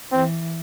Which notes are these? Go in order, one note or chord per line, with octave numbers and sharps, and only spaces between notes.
E3 C4